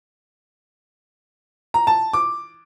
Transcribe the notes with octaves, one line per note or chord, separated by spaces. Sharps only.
A#5
A5
D6